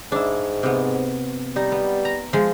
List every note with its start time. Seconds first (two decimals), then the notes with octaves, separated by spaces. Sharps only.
0.12 G#2 D4 E4
0.63 C3 B3
1.56 G3 D#4
1.72 B3
2.05 A#5
2.33 F3 G#3